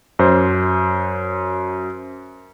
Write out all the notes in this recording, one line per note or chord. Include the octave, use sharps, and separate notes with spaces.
F#2 C5